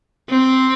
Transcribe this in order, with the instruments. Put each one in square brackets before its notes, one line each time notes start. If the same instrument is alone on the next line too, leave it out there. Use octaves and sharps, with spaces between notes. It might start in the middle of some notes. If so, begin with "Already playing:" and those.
[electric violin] C4